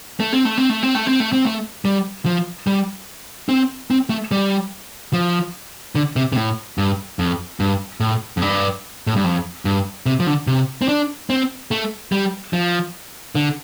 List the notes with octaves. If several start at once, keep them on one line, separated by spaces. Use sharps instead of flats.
A3
C4
A3
C4
A3
C4
A3
C4
A3
C4
A3
G3
F3
G3
C4
C4
A3
G3
F3
D3
C3
C3
A2
G2
F2
G2
A2
F2
G2
A2
G2
F2
G2
C3
F3
D3
C3
C4
D4
C4
A3
G3
F3
D3